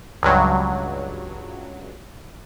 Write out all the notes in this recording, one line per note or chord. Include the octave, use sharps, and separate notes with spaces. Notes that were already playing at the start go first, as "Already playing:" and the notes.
C#2 G2 F#3